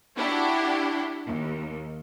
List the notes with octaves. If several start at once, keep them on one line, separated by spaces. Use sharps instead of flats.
D4 E4 F#4 G4
D#2